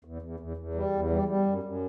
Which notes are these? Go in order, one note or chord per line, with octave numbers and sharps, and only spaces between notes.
E2
E2
E2
E2
G3
E2
G3
G3
F#2
F#2